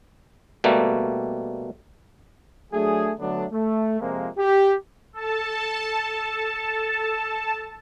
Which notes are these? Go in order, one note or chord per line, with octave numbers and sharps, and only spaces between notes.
B2 G3 A3 A#3
F#3 A3 D4 G#4
D3 F#3 A3 B3 D4
A3
F2 C3 F3 G#3 A#3
G4
A4 A5